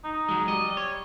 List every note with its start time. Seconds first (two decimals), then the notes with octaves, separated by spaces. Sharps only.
0.04 D#4
0.29 F#3 G#3
0.48 G3 D#5
0.77 C#5